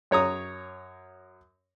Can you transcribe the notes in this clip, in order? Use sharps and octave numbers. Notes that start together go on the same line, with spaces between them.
F#2 C#5 A#5 D#6